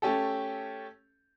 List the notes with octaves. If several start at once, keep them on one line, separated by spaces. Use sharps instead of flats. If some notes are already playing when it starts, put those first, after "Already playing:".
A3 C#4 G4 A4